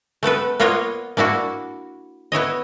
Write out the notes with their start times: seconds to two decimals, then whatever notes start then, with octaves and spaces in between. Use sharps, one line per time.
0.23 A3 B3 A4 B4
0.60 A#3 B3 F4 C#5 D#5 F#5
1.17 A#3 D4 E4 F#4
2.32 B3 E4 C#5 D#5